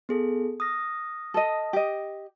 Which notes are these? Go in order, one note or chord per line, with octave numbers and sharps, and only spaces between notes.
B3 G#4 A4
D#6 F6 A#6
A4 D#5
G4 D#5